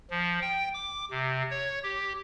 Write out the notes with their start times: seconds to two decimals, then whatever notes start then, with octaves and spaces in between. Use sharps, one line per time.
0.10 F3
0.41 G5
0.74 D6
1.11 C3
1.51 C#5
1.83 G4